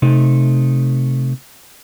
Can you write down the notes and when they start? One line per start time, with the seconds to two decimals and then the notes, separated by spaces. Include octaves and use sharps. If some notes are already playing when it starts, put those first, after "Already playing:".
0.02 C3 A3 D#4